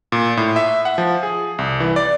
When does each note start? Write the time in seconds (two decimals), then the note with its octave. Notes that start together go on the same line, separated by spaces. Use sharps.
0.12 A#2
0.37 A2
0.56 E5
0.85 F#5
0.98 F3
1.23 G#4
1.58 C2
1.80 E3
1.96 D5